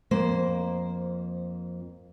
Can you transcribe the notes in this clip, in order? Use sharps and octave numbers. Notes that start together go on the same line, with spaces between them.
F2 A#3 C5